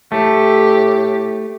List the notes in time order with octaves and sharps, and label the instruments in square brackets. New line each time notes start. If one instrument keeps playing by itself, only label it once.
[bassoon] A2 [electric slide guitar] A3 [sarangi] G4